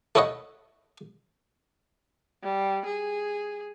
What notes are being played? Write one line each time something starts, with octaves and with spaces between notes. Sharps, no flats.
A3 E4 C#5 D#5 F#5
G3
G#4